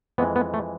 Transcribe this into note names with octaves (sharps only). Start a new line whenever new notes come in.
F2 E3 G#3 B3
B3
A3